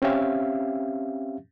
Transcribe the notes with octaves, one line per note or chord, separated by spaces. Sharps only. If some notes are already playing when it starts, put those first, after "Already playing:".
C4 C#4 G4 E5 F5